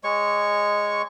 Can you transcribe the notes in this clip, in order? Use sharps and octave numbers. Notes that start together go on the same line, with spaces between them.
G#3 C#5 C#6